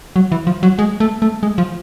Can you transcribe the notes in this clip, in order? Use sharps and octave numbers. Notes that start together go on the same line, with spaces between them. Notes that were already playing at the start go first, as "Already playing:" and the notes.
F#3
E3
F3
F#3
G#3
A3
A3
G#3
F3